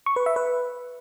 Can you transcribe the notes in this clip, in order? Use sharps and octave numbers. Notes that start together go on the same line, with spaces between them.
C#6
B4
E5
B4